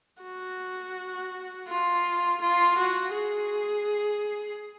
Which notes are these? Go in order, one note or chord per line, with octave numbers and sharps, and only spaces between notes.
F#4
F4
F4
F#4
G#4